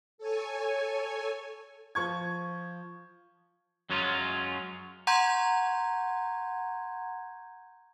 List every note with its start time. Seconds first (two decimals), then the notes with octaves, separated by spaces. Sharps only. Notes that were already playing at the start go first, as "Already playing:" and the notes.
0.18 A4 C#5 G#5
1.95 F3 C#6 G#6
3.90 F#2 F#3 G#3 C#4 F4
5.07 F#5 A#5 C6 C#6 G6 G#6